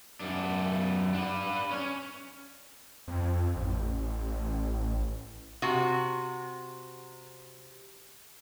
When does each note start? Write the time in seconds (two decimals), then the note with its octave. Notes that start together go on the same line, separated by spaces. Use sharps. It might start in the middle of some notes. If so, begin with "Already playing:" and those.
0.20 F#2 D4
1.14 D4 B4
1.71 C#4 C#5
3.08 F2
3.56 A1
5.62 C3 F#4